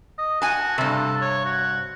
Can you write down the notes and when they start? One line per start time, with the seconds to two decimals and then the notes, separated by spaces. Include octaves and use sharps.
0.18 D#5
0.42 F#4 G#5 A5
0.78 G2 C3 A4
1.22 C#5
1.45 F#4